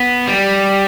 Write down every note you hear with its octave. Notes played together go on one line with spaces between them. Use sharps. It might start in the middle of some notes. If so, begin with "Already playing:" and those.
Already playing: B3
G3